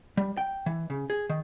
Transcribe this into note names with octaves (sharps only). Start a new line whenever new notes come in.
G3
G5
E3
C#3
G#4
D#3